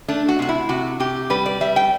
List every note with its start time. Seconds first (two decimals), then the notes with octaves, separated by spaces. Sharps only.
0.08 A3 D4
0.29 F#4
0.39 C3 F#4
0.49 E4
0.69 C3 F#4
1.00 C3 G4
1.30 G3 B4
1.46 D5
1.61 G3 E5
1.76 G5